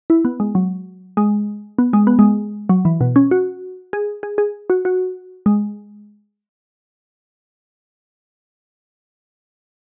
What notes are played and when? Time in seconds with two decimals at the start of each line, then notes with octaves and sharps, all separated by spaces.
0.10 E4
0.25 B3
0.40 G#3
0.55 F#3
1.17 G#3
1.79 B3
1.93 G#3
2.07 B3
2.19 G#3
2.69 F#3
2.85 E3
3.01 B2
3.16 C#4
3.31 F#4
3.93 G#4
4.23 G#4
4.38 G#4
4.70 F#4
4.85 F#4
5.46 G#3